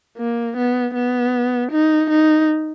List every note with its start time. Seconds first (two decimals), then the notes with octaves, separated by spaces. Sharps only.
0.18 A#3
0.57 B3
0.95 B3
1.72 D#4
2.10 D#4